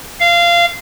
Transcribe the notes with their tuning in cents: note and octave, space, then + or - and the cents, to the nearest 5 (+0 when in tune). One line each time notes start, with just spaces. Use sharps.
F5 -20